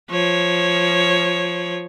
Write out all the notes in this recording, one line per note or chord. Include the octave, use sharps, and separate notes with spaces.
F3 C#5